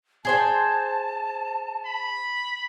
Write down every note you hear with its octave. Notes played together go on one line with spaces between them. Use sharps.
G#4 C5 G5 A5
B5